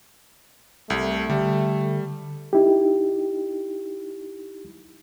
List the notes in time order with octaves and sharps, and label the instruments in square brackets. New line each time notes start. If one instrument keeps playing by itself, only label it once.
[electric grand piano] C2 [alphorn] A3
[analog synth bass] D3 [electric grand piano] G3
[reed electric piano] D#4 E4 G4